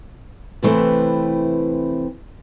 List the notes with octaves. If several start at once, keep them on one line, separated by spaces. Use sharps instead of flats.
C3 E3 A3 C4 E4 B4